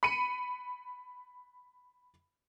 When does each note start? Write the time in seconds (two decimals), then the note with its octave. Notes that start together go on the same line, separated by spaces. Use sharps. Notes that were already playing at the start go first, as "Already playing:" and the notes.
0.03 B5 C#7 D#7